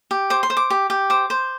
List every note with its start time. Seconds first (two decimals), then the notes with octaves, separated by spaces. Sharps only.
0.11 G4
0.30 C5 D6
0.43 C6
0.50 C5
0.57 D6
0.70 G4
0.90 G4
1.10 C5 D6
1.30 C5